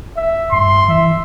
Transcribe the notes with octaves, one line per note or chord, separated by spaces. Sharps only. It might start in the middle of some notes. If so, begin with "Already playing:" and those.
E5
G2 C6
E3 E5